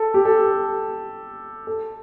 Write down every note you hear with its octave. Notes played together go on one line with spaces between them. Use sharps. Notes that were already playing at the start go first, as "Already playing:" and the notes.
Already playing: A4
G4
A4
A4